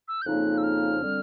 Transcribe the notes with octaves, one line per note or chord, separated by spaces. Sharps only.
E6
G6
F2 C#3 F3 A#3 D#4 F#6
E6
F6
D3 G3 C4